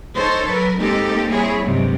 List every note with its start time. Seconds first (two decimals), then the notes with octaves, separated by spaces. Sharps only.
0.14 D#4 A4 A#4 C5 C#5
0.46 F#3 A#4 B4
0.78 G#3 A#3 C4 D#4 G4 A4
1.30 G3 C4 E4 G#4 C#5
1.63 G2 C3 F#3 G#3 C4